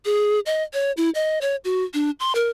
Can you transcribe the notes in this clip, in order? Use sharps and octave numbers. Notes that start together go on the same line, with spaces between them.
G#4
D#5
C#5
E4
D#5
C#5
F#4
D4
C6
A#4